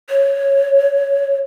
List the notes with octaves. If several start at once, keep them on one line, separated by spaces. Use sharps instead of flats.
C#5